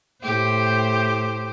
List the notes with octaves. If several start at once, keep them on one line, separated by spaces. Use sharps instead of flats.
A2 G4 C5